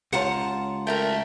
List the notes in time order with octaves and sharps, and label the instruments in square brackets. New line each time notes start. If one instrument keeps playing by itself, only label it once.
[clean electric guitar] C#2 F4 [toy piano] G4 C#5 [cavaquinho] F#5 A5 A#5
[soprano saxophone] A3 [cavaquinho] A#4 G5